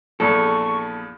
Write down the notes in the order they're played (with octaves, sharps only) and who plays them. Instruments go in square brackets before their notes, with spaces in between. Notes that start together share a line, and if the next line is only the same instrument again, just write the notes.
[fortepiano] A#1 E2 [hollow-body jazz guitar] A4 [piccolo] C#6